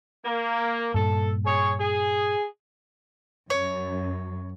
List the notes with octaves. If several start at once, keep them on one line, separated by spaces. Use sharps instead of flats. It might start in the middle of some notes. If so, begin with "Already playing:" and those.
A#3
G2 A#2 A4
G#4 C#5
G#4
F#2 C#5